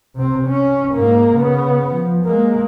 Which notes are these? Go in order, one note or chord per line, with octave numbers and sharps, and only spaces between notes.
C3 C4
C#4
G#2 A#3
C#3 B3
F3
G#3 A#3